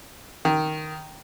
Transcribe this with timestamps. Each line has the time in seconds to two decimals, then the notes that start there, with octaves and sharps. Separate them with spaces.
0.45 D#3